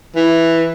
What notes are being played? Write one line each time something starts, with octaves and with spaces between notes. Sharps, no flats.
E3